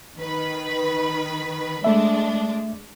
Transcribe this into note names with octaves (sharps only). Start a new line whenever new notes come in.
D#3 B4 B5
G#3 A3 D4 E5